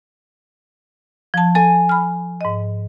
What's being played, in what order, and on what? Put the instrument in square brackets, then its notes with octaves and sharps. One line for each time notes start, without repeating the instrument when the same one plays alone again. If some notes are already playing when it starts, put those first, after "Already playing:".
[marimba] F3 A5
[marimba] A4 [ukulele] G#5
[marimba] B5 F6
G#2 D#5